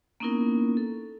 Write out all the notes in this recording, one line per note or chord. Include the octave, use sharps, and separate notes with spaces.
A#3 B3 C#4 D#4 E4 A#4
A4